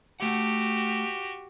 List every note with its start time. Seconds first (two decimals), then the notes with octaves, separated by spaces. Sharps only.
0.20 A3 F#4 G4 F#5